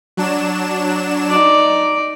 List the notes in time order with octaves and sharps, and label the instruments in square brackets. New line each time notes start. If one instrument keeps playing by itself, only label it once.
[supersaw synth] F#3 D4 E7
[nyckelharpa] D#4 D5